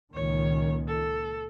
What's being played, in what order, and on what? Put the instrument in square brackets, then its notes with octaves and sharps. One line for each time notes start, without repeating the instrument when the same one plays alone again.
[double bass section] C#2 A#2 D#3 [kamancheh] C#5
[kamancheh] A4